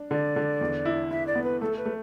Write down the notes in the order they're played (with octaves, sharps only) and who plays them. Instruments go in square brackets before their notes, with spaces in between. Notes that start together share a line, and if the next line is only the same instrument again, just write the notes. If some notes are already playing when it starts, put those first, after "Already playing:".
Already playing: [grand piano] D4
[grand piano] D3 [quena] D5
[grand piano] D3
E2
E4
[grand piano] E4 [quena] E5
[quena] D5
[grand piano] B3
[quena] B4
[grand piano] A3 [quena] A4
[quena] B4
[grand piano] A3